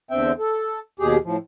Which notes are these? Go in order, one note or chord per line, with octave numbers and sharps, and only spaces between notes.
E2 D3 C4 E5 G5
A4
D#2 B2 G4 G#4
A2 F3